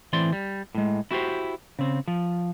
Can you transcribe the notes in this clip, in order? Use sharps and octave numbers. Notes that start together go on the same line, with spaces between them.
A2 E3 C4 D5 C6
G3
A2 G#3
E4 F#4 G4 C5
C#3 C4
F3